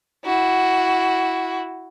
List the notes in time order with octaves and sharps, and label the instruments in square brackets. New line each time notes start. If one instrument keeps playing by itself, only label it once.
[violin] E4 F#4